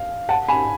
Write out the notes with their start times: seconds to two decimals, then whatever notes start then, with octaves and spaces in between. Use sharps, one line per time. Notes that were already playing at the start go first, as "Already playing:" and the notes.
Already playing: F5
0.29 F#5 A5
0.48 G#5 B5